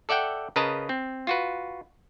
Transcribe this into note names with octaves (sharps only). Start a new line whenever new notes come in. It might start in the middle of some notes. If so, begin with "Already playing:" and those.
A4 D5 E5 F#5 G5
C#3 A#4 B4 D#5 A5 A#5
C4
F4 F#4 B4